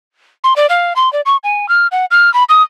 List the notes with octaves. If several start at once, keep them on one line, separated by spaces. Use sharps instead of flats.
C6
D5
F5
C6
D5
C#6
G#5
F6
F#5
F6
B5
D#6